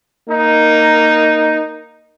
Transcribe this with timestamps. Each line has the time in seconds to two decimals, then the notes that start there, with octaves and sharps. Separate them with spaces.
0.29 A#3 D#4